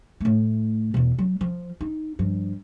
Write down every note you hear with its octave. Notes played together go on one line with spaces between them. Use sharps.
A2 A3
E2 B2
F#3
F3
D#4
G2 F3